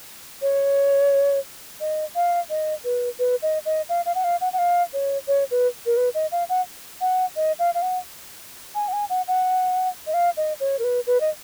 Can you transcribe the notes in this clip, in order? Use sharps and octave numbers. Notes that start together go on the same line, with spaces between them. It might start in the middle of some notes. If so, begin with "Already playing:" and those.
C#5
D#5
F5
D#5
B4
B4
D#5
D#5
F5
F5
F#5
F5
F#5
F#5
F5
C#5
C#5
B4
A#4
B4
D#5
F5
F#5
F#5
D#5
F5
F5
F#5
G#5
F#5
G#5
F#5
F#5
D#5
F5
D#5
C#5
A#4
B4
B4
D#5